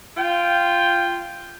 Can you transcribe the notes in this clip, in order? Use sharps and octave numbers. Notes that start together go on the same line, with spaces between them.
F4 G5